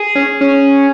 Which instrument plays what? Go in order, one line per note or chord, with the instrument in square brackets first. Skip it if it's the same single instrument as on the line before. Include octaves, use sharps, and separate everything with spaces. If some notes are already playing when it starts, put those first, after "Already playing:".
Already playing: [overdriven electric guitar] G#4
[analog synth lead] C#4
C#4